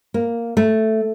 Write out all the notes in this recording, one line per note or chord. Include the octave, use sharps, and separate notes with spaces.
A#3
A3